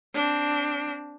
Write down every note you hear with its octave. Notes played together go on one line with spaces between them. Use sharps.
C4 D4